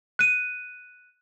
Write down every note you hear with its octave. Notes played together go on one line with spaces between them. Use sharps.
F#6 D#7